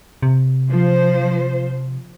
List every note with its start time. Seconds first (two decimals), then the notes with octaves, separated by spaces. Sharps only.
0.22 C3
0.69 F3 C5